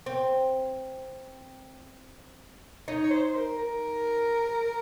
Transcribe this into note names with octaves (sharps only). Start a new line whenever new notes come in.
C4
D#4 C#5
C#5
C5
A#4
A#4